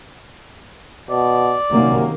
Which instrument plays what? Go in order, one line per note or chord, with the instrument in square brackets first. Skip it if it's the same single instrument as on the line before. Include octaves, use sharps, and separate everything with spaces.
[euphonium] B2 [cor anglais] D5
[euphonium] F#2 [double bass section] C3 D#3 A#3